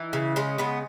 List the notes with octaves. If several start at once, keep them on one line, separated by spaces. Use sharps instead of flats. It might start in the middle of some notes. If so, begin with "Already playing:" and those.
Already playing: E3 D#4
C#3
G#3 C#4
C#3 B3